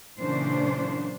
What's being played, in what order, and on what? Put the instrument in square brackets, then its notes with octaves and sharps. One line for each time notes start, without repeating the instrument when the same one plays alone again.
[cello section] A#2 C#3 E3 F#3 D4 C5